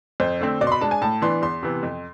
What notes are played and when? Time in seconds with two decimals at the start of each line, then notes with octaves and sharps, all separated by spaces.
0.20 F2 C5
0.41 D3 A3 C4
0.61 B2 D5
0.67 C6
0.72 B5
0.81 G#3 D4 A5
0.91 G#5
1.01 A2 A5
1.22 E3 B3 D4 C6
1.42 E2 C6
1.63 C3 E3 B3
1.83 F2